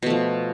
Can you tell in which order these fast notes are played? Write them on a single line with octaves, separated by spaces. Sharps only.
B2 A3 F3